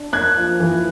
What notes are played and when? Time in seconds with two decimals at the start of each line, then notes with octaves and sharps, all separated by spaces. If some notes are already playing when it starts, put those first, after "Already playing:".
Already playing: D4
0.13 A#3 F#6 G#6
0.37 F3
0.60 E3